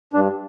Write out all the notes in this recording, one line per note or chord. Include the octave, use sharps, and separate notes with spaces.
G2 D4